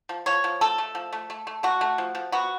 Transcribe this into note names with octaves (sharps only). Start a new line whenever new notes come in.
F3
F3 C#5
F3
A3 A4
A3
F3
A3
A3
A3
A3 F#4
A3
F3
F3
B3 F#4